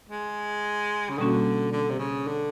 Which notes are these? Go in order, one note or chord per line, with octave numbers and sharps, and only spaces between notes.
G#3
C#3
B2 D3 G3 A#3 C#4 F#4
D3
C3
C#3
D3